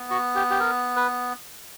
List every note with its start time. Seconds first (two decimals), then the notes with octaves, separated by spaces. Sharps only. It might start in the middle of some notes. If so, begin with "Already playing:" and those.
Already playing: B3
0.10 F#4
0.35 G4
0.50 G4
0.60 A#4
0.96 B4